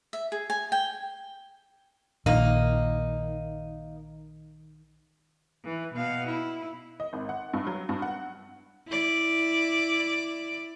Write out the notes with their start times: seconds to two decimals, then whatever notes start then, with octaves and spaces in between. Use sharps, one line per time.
0.13 E5
0.32 G#4
0.50 G#5
0.72 G5
2.26 A#1 A#2 D#3 A#3 D#4
5.65 E3
5.94 B2 F5
6.27 E4
7.00 D#5
7.13 G#1
7.29 F#5
7.53 G2
7.67 F#3
7.89 G2
8.02 F#5
8.88 E4 D5